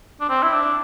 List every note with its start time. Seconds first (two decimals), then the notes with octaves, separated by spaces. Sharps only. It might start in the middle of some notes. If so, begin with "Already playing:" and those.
0.20 D4
0.30 C4
0.43 E4
0.53 D4